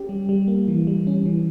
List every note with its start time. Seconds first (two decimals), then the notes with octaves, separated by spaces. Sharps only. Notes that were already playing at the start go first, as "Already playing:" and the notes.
Already playing: C#4 G4
0.09 G3
0.29 G3
0.48 A#3
0.68 E3
0.87 G3
1.07 C#4
1.26 E3